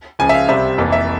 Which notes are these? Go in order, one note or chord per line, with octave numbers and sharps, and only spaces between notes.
C#2 C#3 F3 G#5
E5
F5
C2 C3 G3 C4 E5
F1 F2 E3 A#3
E5